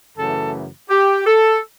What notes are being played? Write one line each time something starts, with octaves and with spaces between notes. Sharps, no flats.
F#2 C#3 E3 A3 A4
G4
A4